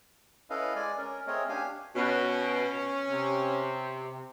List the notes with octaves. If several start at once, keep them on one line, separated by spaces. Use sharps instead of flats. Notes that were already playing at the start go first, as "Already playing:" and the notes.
C#4 E4 A4 B4 D#5 F5
G#3 D5 G#5
C#4 A#4
A3 C4 G#4 A#4 C#5 D#5
C#4 D4 G4 F5 G#5
B2 C#4
C3